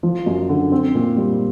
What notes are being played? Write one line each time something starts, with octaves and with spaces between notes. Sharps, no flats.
F3
F#2
D3
C4
A#2
G3